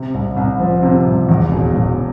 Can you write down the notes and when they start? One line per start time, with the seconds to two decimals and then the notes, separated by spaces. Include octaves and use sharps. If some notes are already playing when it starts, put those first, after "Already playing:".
Already playing: C3
0.14 C2
0.37 C2
0.60 F3
0.83 C3
1.06 C2
1.29 E2
1.52 E1
1.75 E1